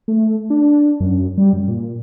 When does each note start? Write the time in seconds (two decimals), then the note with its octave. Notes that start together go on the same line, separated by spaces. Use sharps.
0.08 A3
0.50 D4
1.00 F#2
1.38 G3
1.53 F#2
1.68 A#2